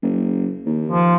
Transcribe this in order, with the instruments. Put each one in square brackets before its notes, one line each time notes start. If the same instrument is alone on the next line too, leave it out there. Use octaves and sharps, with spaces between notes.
[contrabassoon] F#1
D#2
[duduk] F3